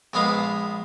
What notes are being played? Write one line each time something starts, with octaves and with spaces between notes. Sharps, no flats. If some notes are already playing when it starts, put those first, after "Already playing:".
A#1 G#3 B3 F5